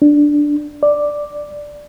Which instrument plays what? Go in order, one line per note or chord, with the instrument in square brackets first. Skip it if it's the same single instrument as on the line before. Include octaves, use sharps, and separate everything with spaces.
[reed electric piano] D4
D5